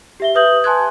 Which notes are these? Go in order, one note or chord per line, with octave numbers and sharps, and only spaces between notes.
G4 E5 G7
B4 E5 D#6 G6 F#7
G#5 A5 C6 F#6 G#6